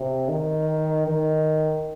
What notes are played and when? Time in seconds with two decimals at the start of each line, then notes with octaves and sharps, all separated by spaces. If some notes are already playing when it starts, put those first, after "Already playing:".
Already playing: C3
0.29 D#3
1.08 D#3